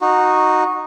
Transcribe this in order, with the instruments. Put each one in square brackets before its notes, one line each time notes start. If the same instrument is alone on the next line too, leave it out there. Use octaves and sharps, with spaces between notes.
[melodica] D#4 F#4